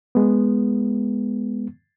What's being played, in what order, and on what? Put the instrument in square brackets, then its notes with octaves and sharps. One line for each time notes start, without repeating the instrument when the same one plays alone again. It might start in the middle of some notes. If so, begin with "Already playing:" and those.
[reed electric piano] G#3 B3